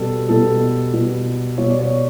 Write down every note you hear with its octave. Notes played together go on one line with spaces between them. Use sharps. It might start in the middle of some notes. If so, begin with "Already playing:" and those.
Already playing: B2 G3 B3 A4
B2 G3 B3 A4
B2 G3 B3
B2 G3 B3 C#5
D5
C#5